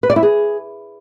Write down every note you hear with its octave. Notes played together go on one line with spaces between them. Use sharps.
B4
D5
E4
G#4